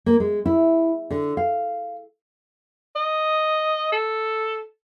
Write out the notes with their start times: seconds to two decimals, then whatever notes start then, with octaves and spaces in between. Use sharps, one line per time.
0.06 A#3
0.20 G#3
0.46 E4
1.10 D3
1.37 F5
2.95 D#5
3.92 A4